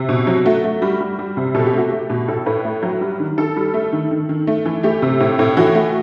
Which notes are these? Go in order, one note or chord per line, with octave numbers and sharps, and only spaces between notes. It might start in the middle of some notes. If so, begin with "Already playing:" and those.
Already playing: C3
B2
F#3
A3 F#4
A3
G3
G3
G3
C3
B2 A4
G4
A3 F#4
A3 G4
B2
A2 A4
A2 B4
A3
F#3
G3
D#3
D#3 A4
G3
A3
D#3
D#3
D#3
A3
E3
A3 G4
C3
A2
A2
E3 F#4
A3